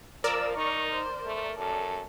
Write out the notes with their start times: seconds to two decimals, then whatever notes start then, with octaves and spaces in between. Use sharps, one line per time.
0.24 F3 A#4 D5 E6
0.57 D#4 C#6
0.91 C5
1.26 A3
1.58 F#2 A4